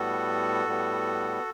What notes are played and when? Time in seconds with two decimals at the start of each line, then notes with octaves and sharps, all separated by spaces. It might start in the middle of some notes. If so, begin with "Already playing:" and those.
Already playing: A2 G3 B3 F#4 A4
0.66 A2 G3 B3